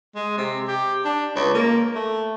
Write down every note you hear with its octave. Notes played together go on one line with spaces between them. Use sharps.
G#3
C3
G4
D4
C#2
A#3
A3